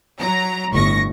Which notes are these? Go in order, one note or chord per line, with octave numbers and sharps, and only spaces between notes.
F#3 A#5
G1 A2 C#6 A#6